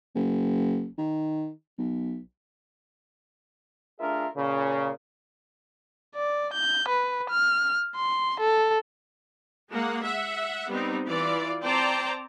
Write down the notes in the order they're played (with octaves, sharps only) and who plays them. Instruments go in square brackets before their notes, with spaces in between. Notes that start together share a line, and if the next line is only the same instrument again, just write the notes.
[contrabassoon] F#1
D#3
B1
[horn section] A3 D4 F4 G#4 A#4 E5
A#2 C#3
[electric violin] D5
G6
B4
F6
C6
A4
[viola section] G#3 A#3 F#5
E5 F#5
G3 B3 C4 D#4
E3 F4 D5
C4 C5 D5 G5 A5 A#5